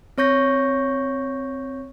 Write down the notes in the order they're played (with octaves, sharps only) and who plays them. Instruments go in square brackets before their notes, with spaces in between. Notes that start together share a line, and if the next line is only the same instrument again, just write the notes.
[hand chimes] C4 C#5 C#6 G6 A#6